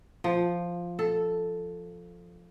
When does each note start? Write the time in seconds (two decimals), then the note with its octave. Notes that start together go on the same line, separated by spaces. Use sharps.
0.24 F3
0.99 A4